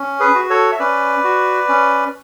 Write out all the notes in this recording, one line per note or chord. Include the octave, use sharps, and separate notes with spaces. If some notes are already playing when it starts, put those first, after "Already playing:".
Already playing: C#4
G#4 B4
F#4
A4 C#5
E5
C#4 B4 D5
F#4
C#4